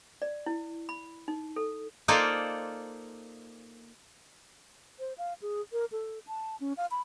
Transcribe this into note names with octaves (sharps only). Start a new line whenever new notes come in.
D5
E4
B5
D#4
A4
A#3 D#4 F4 A4 C5 D5
C5
F5
G#4
A#4
A4
A5
C#4
F5
B5